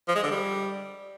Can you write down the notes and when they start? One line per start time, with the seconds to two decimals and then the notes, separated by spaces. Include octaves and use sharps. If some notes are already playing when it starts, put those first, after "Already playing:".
0.08 F3
0.16 G#3
0.23 D3
0.31 G3